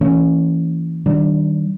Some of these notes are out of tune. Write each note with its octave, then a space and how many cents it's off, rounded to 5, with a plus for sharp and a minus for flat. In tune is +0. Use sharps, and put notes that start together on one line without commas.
E3 +0 A#3 -35 C#4 +0
D#3 +0 G3 -30 D4 +0